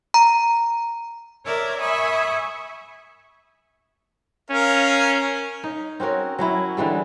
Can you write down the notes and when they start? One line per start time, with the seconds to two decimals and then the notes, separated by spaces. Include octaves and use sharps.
0.14 A#5
1.45 A#4 C#5 D5 E5
1.80 E5 G#5 B5 C#6 D#6
4.51 C#4 A#4 F5
5.63 D#4
6.00 C4 C#4 F#4 A#4
6.39 F#3 C#4 E4
6.77 D3 E3 G3 G#3